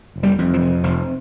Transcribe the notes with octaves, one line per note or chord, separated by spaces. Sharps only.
F1
G3
F2
F3
C3
F1 F3